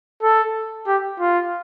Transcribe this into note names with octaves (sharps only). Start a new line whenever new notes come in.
A4
G4
F4